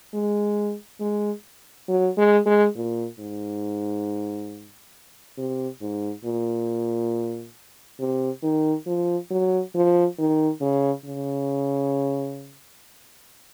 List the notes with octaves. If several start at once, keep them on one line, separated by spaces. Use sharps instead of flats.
G#3
G#3
F#3
G#3
G#3
A#2
G#2
C3
G#2
A#2
C3
D#3
F3
F#3
F3
D#3
C#3
C#3